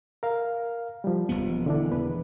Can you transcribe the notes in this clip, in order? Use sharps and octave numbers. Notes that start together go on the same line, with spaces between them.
A#4 F5
F3 G3
E1 D#2 B3
D3 E3 D4
E2 B4